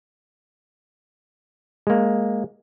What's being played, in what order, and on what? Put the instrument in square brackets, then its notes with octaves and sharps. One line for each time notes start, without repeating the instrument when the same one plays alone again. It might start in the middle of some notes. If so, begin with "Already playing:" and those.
[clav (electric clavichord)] G#3 A#3